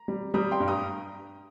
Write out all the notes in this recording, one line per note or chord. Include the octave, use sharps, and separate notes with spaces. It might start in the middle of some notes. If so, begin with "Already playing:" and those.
Already playing: A#5
G3
G3 A#5 D#6
G5 C6
G2
A#5 D#6